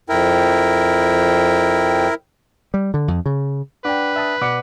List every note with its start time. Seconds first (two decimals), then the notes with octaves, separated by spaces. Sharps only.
0.09 F2 E4 A#4 G5
2.74 G3
2.94 D3
3.08 F2
3.26 C#3
3.85 D4 B4 F#5 G5 D6
4.16 E5 A5 D#6
4.42 B2 D5 F#5 D6 C#7